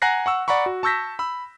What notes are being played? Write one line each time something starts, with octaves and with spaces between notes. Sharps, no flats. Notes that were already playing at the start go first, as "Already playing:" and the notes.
F#5 G#5 A#5 F#6 A#6 C7
F#5 C#6 E6
D5 F#5 A#5 B5 C#6
F#4
A5 C#6 E6 G6 A#6 B6
B5 E6